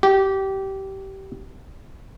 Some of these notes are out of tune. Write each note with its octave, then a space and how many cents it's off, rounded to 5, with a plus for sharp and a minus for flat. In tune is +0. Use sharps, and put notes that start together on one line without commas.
G4 -20